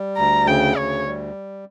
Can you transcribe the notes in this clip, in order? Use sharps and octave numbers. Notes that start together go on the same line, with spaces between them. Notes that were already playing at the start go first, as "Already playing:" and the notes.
Already playing: G3
D2 A#5
C#3 G5
D2 C#5
G3